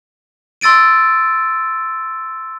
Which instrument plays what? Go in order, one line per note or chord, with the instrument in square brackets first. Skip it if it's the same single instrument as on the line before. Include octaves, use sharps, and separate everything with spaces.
[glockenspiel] C6 E6 A6 D7 D#7